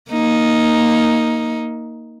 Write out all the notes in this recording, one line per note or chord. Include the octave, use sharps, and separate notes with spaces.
A#3 D#4